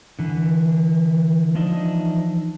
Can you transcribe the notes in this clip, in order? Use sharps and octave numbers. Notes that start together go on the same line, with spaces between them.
D3 E3
E3 F3 D4 D#4 D#5 E5